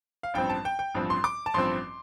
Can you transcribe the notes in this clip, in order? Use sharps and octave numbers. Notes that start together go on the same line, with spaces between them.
F5
A1 G2 F3 C4 G5
A5
G5
G5
A1 G2 F3 C4
C6
D6
A5
A1 G2 F3 C4 C6